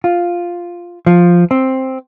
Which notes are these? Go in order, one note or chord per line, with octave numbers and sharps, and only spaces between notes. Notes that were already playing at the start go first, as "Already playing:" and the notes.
F4
F3
C4